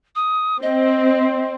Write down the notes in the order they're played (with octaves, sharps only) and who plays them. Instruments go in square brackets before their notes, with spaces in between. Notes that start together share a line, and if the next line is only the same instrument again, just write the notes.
[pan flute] D#6
[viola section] C4 [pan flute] D#5